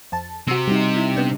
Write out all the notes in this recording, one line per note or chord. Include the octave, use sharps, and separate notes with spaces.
F2 A5
C3 F#4 E6
G3 D#4
E4
B3 D4 G5